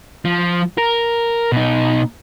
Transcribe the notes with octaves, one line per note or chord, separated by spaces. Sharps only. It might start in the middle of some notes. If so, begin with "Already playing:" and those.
F3
A#4
B2 D#4